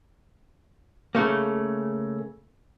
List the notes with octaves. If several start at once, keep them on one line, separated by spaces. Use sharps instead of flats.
C#3 A3 A#3